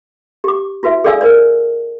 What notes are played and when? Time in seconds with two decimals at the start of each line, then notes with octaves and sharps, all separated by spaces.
0.44 G4 D6
0.83 E4 F#4 B4 E5
1.04 G#4 A4 D5 F5 G#5 E6
1.21 A#4 C5 D5